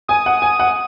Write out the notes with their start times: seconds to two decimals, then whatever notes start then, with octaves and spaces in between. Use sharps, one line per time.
0.08 G#5 D#6
0.26 F#5
0.42 G#5
0.60 F#5